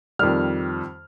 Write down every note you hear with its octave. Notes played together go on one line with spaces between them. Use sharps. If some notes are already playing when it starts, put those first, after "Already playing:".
F2 D#3 G3 F6